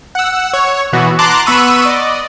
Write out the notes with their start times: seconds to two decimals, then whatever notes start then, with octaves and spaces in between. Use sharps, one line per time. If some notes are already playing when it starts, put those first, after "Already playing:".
0.15 F#5 E6
0.53 C#5
0.93 B2 E3 B3 F#4
1.19 A5 A#5 C6 D6 F#6
1.46 B3 B5 C#6 E6 F#6 D#7
1.85 D5 D#5